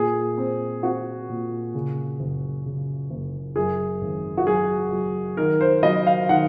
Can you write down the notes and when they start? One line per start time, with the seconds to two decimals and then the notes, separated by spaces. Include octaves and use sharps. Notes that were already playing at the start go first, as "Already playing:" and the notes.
Already playing: A#2 G#4
0.38 C4
0.83 C4 F#4
1.29 A#2
1.74 C#3
2.20 F#1
2.66 C#3
3.10 F#1
3.56 F#2 G#4
4.01 G#1
4.37 F#4
4.47 F#3 G#4
4.92 F#3
5.37 D#3 A#4
5.61 C5
5.83 F#3 D#5
6.07 F5
6.29 D#3 F#5